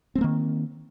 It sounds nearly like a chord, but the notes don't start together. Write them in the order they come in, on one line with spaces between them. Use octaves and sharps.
C4 A3 A#3 D#3